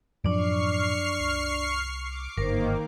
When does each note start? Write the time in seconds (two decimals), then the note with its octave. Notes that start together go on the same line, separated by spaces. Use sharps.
0.24 F#2 A2 F3 D4 D5 C#6 F6 C7
1.20 C2
2.03 D6
2.38 G1 G#2 D#3 A#3 A#4 C5